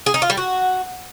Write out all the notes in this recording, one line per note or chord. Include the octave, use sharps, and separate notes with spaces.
G#4
D#4
F4
G3
F#4